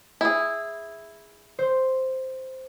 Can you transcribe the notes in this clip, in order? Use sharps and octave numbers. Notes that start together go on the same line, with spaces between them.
E4 G#4
C5